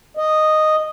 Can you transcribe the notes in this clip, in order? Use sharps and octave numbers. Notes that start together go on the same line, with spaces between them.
D#5